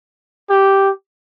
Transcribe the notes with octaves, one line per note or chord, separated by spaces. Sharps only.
G4